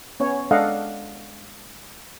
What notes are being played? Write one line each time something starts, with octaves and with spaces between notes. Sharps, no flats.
B3 C#4 C#5
G#3 D4 A4 D#5 F5 F#5